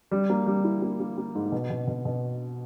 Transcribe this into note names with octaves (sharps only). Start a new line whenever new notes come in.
G3
A#3
G3
E4
A#3
A#3
A#3
G#2
B2
B2
B2
B2